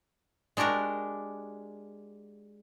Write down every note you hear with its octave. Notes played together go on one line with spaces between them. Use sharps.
G#3 D4 F#4 G4 A#4